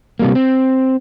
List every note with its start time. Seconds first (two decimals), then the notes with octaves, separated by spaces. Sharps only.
0.20 C3 G3 A#3
0.35 C4